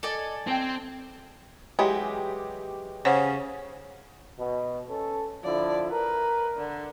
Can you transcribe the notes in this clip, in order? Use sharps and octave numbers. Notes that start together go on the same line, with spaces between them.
A4 D5 D#5 G#5
C4 C5 G5 A5
E3 F#3 G#3 G4
C#3 C5 C#5 F#5
B2
C#4 A4
D3 F3 E4 D5
A#4 B4
D3